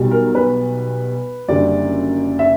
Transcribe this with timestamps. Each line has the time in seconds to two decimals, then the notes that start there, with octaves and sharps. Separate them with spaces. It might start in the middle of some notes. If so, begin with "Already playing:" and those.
Already playing: B1 B2 G3
0.11 A#4
0.35 B4
1.48 F#1 F#2 D3 G3 D5
2.39 E5